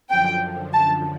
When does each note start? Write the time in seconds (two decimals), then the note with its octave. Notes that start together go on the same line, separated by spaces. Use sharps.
0.10 F#2 D3 F3 G5
0.74 A5